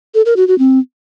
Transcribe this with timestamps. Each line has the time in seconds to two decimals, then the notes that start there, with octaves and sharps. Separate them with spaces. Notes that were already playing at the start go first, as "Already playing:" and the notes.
0.15 A4
0.26 A#4
0.37 F#4
0.48 F#4
0.59 C4